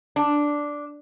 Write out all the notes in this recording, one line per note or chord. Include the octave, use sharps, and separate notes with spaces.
D4